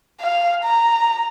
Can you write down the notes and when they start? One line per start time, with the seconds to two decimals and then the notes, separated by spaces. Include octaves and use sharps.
0.21 F5
0.64 A#5